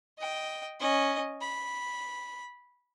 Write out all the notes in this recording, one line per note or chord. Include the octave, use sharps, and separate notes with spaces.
D#5 G5
C#4 D#5
B5